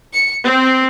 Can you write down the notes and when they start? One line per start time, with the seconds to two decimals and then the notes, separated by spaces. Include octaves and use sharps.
0.13 C#7
0.44 C4